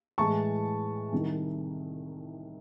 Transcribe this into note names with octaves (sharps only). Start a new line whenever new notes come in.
A2 E3 G#3 A5 C#6
C2 C3 D#3